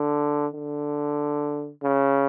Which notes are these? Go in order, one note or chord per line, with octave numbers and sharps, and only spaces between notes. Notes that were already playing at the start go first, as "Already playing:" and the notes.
Already playing: D3
D3
C#3